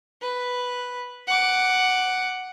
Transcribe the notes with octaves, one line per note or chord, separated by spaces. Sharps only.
B4
F#5 D6